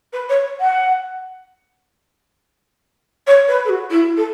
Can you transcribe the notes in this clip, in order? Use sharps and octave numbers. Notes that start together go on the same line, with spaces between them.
B4
C#5
F#5
C#5
B4
A4
F#4
E4
A4